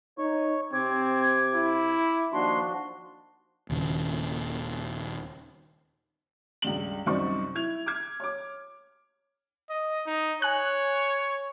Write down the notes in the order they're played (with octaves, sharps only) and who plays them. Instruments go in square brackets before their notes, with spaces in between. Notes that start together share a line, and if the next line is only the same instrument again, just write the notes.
[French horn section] D#4 [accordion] C#5 C#6
[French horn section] C3 [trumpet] C4 [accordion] D6 [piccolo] G#6
[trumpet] E4
[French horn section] D#2 [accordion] F3 D4 F#4 [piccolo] C6
[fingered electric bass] D#1 D#2 C#3
[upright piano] C#2 G2 F#7
C2 F#2 D#4 C5 D5 C#6
E4 G#6 F7
D6 F6 G#6
C#5 D6
[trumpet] D#5
D#4
[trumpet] C#5 [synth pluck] G#5 F#6